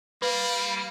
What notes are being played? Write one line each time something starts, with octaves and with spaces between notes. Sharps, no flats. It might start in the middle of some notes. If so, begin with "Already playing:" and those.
G3 A#3 B4 F5